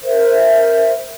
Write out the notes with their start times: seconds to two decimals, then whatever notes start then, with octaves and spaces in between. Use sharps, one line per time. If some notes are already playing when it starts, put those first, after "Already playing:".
0.03 A#4 C5 E5